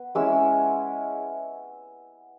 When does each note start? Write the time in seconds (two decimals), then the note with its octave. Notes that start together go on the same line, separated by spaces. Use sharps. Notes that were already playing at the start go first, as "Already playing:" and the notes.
Already playing: B3
0.15 G#3 C#4 E4 E6